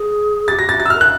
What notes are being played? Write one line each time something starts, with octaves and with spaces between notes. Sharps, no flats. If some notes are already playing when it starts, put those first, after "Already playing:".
Already playing: G#4
G4 A6
F#4 A#6
G4
A6
F#4 A6
E6
A#4 F6
F#6